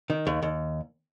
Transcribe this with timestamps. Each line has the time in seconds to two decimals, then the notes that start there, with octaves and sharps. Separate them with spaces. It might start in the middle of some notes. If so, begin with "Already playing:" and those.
0.10 D#3
0.27 D#2
0.43 D#2